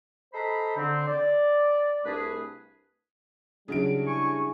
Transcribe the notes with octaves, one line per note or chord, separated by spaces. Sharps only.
A4 C5 D#5 A#5 B5
D3 C4
D5
C2 A3 D4 G#4 B4
C#3 F#3 G3 D4 E4 D7
G#5 C#6